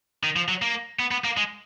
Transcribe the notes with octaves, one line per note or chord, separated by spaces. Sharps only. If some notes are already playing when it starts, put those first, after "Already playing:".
D#3
F3
F#3
A#3
B3
B3
A#3
G#3